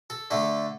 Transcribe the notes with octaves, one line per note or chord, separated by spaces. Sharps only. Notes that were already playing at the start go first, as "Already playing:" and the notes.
A4
D3 A3 A4